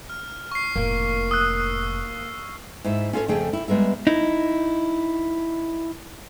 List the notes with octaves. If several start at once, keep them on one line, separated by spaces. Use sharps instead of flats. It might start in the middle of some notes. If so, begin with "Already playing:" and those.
F6
C#6 C7
F1 A2 A#3
D#6 E6 F#6
G#2 E4 E5
C#4 F4 A4 A#4 C#5
F2 C#3 A3 G#4 G5
E4
G3 G#3 B3 A#4 E5
D#4 E4